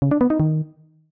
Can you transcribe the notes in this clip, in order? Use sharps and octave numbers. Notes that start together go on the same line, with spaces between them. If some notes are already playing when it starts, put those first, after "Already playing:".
C#3
D4
B3
D#4
D#3